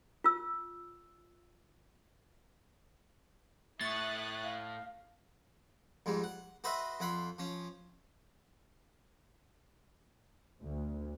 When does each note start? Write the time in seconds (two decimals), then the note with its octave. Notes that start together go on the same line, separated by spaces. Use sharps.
0.24 F4 E6
3.81 A2 E5 C#6 D#6 F#6 A6
4.43 F5
6.06 F2 G#2 G3
6.24 F#5
6.64 F#4 B4 C5 D#5 E5 F#5
7.00 F2 F#5 B5 C6
7.38 F3 C#4
10.61 D2